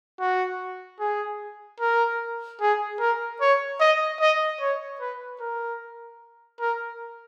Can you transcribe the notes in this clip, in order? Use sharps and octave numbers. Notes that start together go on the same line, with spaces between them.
F#4
G#4
A#4
G#4
A#4
C#5
D#5
D#5
C#5
B4
A#4
A#4